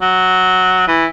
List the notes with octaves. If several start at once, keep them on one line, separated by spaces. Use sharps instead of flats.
F#3
E3